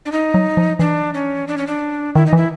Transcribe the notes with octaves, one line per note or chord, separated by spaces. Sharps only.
D4
D#4
F#3
F3
E3 D4
C#4
D4
C#4
D4
D#3 E4
D#4
E3 E4